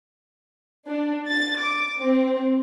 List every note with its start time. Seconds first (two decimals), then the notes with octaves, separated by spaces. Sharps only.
0.88 D4
1.30 A6
1.60 D6
2.00 C4